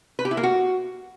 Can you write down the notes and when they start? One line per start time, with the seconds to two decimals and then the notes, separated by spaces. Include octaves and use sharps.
0.19 B4
0.25 G4
0.31 E4
0.37 A#3
0.43 F#4